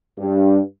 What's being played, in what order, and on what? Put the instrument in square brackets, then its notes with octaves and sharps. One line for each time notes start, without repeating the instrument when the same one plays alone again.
[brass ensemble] G2